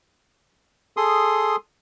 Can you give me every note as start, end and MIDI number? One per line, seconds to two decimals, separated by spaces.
0.97 1.56 68
0.97 1.56 69
0.97 1.56 84
0.97 1.56 87